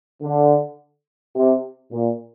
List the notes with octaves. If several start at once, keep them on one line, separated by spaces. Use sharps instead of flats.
D3
C3
A#2